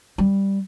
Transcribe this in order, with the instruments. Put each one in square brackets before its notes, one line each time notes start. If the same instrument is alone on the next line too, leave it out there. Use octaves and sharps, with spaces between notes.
[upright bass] G3